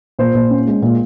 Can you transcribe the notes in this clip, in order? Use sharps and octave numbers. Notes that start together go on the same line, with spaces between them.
A#2 C5
A#2
C#4
G#3
A#2